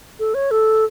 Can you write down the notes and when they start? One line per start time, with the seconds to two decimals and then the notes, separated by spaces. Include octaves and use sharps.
0.20 A4
0.34 C#5
0.51 A4